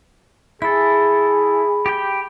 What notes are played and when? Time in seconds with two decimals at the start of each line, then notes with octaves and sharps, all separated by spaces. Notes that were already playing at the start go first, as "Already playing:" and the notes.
0.62 E4 G#4 A4 B5
1.86 G4 G5